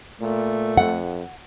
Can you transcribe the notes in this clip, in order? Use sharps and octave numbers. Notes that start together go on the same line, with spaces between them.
A#2 A3
F2 F#5